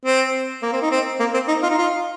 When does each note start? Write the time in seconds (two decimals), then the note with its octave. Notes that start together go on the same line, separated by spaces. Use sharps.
0.05 C4
0.63 A#3
0.73 C4
0.82 D#4
0.91 C4
1.20 A#3
1.34 C4
1.48 D#4
1.63 F4
1.70 D#4
1.78 F4